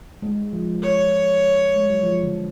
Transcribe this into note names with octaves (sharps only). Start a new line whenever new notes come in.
G#3
F3
C#5
G#3
F#3
F3
D3